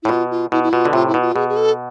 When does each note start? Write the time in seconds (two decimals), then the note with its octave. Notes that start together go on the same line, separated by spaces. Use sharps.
0.03 A2 E4
0.09 B2 F4
0.31 F4
0.52 B2 E4
0.63 E4
0.72 B2 F4
0.85 D3
0.93 A2 C3 F4
1.08 E4
1.14 B2
1.22 F4
1.35 B2 G#4
1.49 G#4
1.57 A4